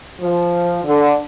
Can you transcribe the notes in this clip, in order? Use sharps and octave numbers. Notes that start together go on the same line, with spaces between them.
F3
D3